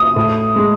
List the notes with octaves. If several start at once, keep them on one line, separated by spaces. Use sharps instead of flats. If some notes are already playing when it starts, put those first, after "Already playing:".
Already playing: D#6
A2
G#3